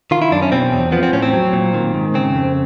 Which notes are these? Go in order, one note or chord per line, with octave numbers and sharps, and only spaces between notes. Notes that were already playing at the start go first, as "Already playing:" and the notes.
D#3 F4
E4
F#2 D4
C#4
B2 C4
E2
F3 B3
C4
A2 C#4
C4
F#3
A#2
D#3
G#2
C#3 C4
F2